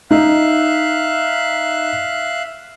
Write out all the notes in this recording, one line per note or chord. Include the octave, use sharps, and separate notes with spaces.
D#4 E5 F5 F#6